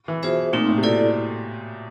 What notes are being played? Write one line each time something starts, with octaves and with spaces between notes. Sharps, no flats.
E3
B2 F4 G#4 C5 E5
A#2 A3 C4 D#4
A2
C3
B2 E4 A4 D5